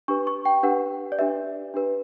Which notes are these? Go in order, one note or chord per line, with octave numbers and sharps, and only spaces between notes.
D4 G4 B4 C#6
C#6
G5
D4 G4 B4 F#5
D5
D4 G4 B4 E5
D4 G4 B4